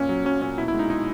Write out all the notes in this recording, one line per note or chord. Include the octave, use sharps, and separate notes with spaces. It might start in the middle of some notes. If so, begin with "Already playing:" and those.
Already playing: A#2 C#4
F#3
F#3 C#4
A#2 C#4
B2 E4
E4
G#3
D#4
G#3 D#4